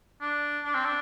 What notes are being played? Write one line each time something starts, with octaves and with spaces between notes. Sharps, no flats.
D4
D4
C4
D4